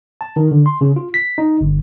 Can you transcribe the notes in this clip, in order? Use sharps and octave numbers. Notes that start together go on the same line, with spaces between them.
A5
D#3
D3
C6
C#3
F4
B6
D#4
G1